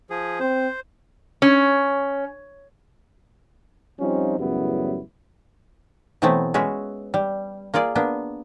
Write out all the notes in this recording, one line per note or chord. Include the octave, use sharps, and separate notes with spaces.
F3 G#4
C4 C5
C#4
F3 G3 C4 C#4 D#4 F4
A1 F#2 C#3 G3 B3 E4
B2 E3 F#3 A3 B3 C4
G#3 C#4 F#4 B4 E5
G3
A#3 F4 G#4 D5
A#3 B3 D4